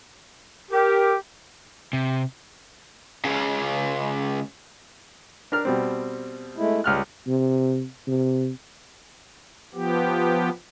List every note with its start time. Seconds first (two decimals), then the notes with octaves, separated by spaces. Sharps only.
0.71 G4 A#4
1.93 C3
3.24 C#2 C#3
5.52 D4 A#4 F6
5.65 B2 G3 C4
6.57 G#3 A3 E4
6.84 C#2 G3 F6 F#6
7.27 C3
8.08 C3
9.74 F3 B3 G4